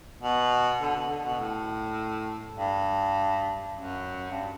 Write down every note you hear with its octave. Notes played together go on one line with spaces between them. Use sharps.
B2
D3
B2
D3
B2
A2
G2
F#2
G2